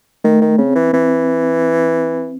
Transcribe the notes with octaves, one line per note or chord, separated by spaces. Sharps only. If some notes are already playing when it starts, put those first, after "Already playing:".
D#3 A3
D#3
C#3 C4
E3
E3 C4